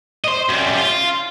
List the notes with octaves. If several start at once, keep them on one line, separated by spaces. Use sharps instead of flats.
C5 D#5
F#2 G3
F4